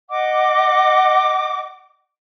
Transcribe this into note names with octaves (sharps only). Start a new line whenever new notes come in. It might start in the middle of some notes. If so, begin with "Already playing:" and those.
D#5 F#5 D6